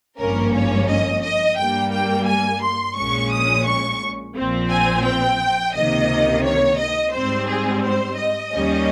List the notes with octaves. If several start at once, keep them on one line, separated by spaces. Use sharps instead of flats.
G#1 G2 F3 A#3 C#4 A#4
C#5
D#5
D#5
G2 G3 A#3 G5
G5
G#5
C6
A#1 A#2 G#3 C#4 C#6
D#6
C#6
A#1 A#2 F3 C4
G#5
G5
C#2 C3 D#3 A#3 D#5
C#5
D#5
G#2 G3 C4 C5
G#4
C5
D#5
D#2 D#3 G3 A#3 C#4